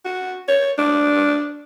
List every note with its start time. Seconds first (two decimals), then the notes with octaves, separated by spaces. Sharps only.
0.05 F#4
0.48 C#5
0.78 D4